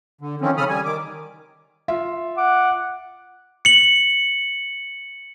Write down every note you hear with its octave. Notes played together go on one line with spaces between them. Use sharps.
D3
D#3 F3 C4 C#4
C#3 C#4 A4 B5 D#6 F6
G3 G#5
D#3 D6
F4 E5
F#5 D6
C#7 F#7